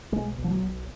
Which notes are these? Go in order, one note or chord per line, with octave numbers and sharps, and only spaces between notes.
B1 G#3
B1
F3
F#3
B1